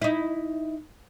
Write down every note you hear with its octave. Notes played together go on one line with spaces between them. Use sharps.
D#4 E4